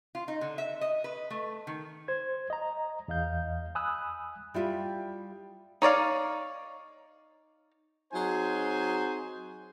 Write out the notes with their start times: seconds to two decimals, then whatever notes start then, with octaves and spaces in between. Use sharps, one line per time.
0.15 F4
0.28 D#4
0.41 D3
0.58 E5
0.81 D#5
1.04 B4
1.30 A3
1.67 D#3
2.08 C5 G#6
2.50 D#5 A#5
3.08 E2 D#5 F5 G6
3.75 G#5 B5 D#6 E6 F#6
4.54 G3 E4 F4 G4
5.82 D#4 C#5 D5 F5
8.13 F#3 C4 D#4 G#4 C5 G#5